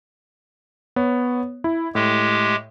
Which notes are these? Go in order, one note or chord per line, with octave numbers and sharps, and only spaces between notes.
B3 C#5
E4
A2 G#3 G4